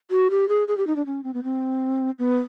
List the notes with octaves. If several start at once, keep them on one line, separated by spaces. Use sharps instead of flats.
F#4
G4
G#4
G#4
G4
D#4
D4
C#4
C4
B3
C4
B3